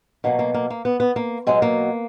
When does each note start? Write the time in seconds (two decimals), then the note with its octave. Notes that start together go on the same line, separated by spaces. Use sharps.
0.24 B2 F#3 A#3
0.39 A#3
0.54 A#3
0.70 A#3
0.85 B3
1.00 B3
1.16 A#3
1.47 B2 F#3 G#3
1.62 A#3